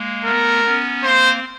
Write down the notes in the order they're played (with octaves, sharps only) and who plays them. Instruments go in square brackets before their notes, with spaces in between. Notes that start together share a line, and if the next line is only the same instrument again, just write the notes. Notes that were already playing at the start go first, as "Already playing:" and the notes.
Already playing: [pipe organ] G#3 A#3
[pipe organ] A3 B3 [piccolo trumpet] A#4
[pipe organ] B3 C#4
[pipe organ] A#3 C4 [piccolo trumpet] C5